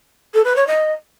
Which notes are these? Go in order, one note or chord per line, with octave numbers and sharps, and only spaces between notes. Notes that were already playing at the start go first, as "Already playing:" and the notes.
A4
B4
C#5
D#5